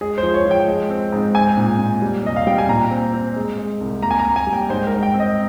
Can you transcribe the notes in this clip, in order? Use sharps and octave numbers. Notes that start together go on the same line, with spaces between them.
G#3 G#4
C5
F3
C#5
F3
G5
G#3
C4
G#2
C4 G#5
A#2
A#2
G3
C3 D#5
F5
G3 G5
G#5
A#2 A#5
C4
C4
G#3
G#3
C2
A#3 A#5
G#5
A#5
A#3
G#5
G3
G5
G#2 C5
A#4
G#2
G5
C4
D#5